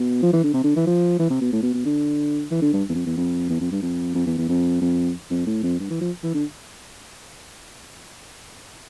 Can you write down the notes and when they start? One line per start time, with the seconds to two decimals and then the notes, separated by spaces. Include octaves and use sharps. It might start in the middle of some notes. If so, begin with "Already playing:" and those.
Already playing: B2
0.23 F3
0.33 E3
0.44 D3
0.54 C3
0.64 D3
0.76 E3
0.87 F3
1.19 E3
1.30 C3
1.41 B2
1.52 A2
1.63 B2
1.74 B2
1.85 D3
2.51 E3
2.62 D3
2.73 G2
2.89 E2
2.94 F2
3.06 E2
3.17 F2
3.49 E2
3.61 F2
3.72 G2
3.82 F2
4.15 F2
4.27 E2
4.38 E2
4.49 F2
4.82 F2
5.30 F2
5.47 A2
5.63 F2
5.80 G2
5.90 E3
6.01 F3
6.23 E3
6.34 D3